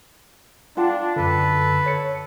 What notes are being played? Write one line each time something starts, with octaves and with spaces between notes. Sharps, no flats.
D4 F4 F#5 A5
F#2 D3 A4 B4
C#5 C#7